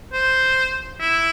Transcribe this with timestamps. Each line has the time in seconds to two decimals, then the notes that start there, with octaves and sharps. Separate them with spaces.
0.13 C5
1.00 E4